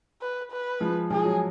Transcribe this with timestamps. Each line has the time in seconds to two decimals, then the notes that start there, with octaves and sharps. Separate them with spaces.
0.21 B4
0.51 B4
0.80 F3 G#3
1.10 F3 G#3 G#4
1.25 F#3